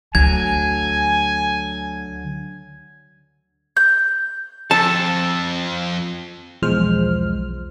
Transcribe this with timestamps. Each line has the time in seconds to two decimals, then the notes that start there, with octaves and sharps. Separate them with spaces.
0.15 D2 D3 F#3 G#5 G#6
3.77 G6
4.71 F2 A4 A5
6.62 B1 E2 F3 G#3 C5 F6